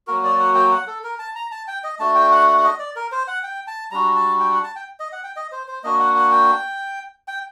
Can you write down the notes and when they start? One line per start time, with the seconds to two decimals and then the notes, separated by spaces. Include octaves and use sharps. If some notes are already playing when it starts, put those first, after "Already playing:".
0.07 F#3 A#3 F#4 A#4
0.24 D5
0.40 F#5
0.55 G5
0.71 F#5
0.87 A4
1.04 A#4
1.19 A5
1.35 A#5
1.52 A5
1.68 G5
1.84 D#5
2.00 A3 D4 F#4 A5
2.15 G5
2.32 F#5
2.48 F#5
2.58 F#5
2.64 D#5
2.79 D5
2.96 A#4
3.12 C5
3.28 F#5
3.43 G5
3.67 A5
3.91 G3 D4 F#4 A#5
4.16 A5
4.40 G5
4.52 F#5
4.63 A5
4.76 G5
5.00 D#5
5.12 F#5
5.24 G5
5.36 D#5
5.52 C5
5.68 C5
5.84 A#3 D4 F#4 D#5
6.00 F#5
6.16 F#5
6.32 G5
7.28 G5